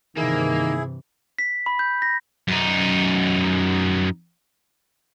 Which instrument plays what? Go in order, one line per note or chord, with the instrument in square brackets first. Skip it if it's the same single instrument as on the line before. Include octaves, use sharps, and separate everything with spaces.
[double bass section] G2 C3 E3 [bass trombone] D#3 [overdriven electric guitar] A#3 [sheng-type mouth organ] E4 G#4
[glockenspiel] B6
B5
G6
A#6
[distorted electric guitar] F#2 D#4